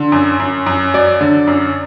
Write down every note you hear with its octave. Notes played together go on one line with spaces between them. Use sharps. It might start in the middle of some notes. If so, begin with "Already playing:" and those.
Already playing: D3 C6
F#2
F#2
F#2
F#3 D5
D3
F#2